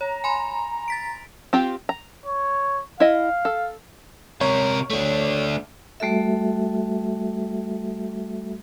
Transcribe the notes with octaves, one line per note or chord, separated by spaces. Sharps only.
C#5 A#5
G#5 B5 C6
A6 B6 D7
C4 F4 G4
A#5
C#5
E4 D#5 F5
A4
C3 A#4 C#5
A3 D4
G3 A3 F#4 A4 E5